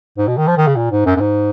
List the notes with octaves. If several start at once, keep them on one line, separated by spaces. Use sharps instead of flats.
G#2
B2
D#3
F3
D#3
C#3
A#2
G#2
F#2
F#2
G#2